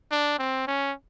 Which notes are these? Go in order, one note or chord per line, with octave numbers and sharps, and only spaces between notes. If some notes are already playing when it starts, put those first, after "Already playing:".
D4
C4
C#4